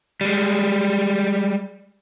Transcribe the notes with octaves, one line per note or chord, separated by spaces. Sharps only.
G3 G#3